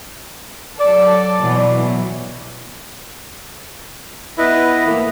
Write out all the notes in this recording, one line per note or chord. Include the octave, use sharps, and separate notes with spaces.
F#3 A4 D5
B2 E3 F#3
B3 E4 B4 D#5
A2 E3 A#3